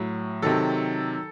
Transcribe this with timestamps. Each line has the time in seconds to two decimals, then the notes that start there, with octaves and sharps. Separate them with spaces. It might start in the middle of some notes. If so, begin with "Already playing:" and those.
Already playing: A2 F#3
0.42 C3 D#3 F#3 A4